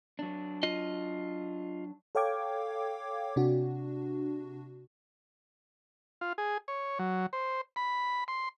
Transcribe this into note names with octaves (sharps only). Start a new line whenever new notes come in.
F#3 D4
F4 D#5
A4 C#5 F5 G5 D6 G#6
C3 D4 F#4
F4
G#4
C#5
F#3
C5
B5
C6